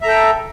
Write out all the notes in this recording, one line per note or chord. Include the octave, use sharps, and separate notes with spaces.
A4 E5 G5 A#5